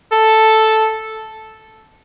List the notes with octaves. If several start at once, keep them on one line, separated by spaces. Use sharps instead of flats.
A4